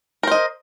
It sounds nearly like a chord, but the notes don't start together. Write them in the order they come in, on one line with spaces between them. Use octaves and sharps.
A#4 C5 D#5